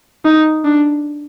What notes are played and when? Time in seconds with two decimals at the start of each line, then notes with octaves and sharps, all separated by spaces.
0.25 D#4
0.65 D4